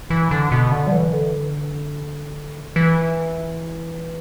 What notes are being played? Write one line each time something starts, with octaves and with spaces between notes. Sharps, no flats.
E3
D3
B2
D3
G3
E3
D3
E3